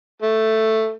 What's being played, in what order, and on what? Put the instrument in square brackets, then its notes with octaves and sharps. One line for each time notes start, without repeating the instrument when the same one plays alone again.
[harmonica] A3